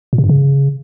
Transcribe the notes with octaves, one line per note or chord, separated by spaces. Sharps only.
A#2
C3
G2
C#3